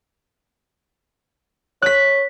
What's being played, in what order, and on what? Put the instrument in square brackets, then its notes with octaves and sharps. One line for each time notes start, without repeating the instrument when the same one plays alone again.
[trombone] C#5 [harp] F#6 B6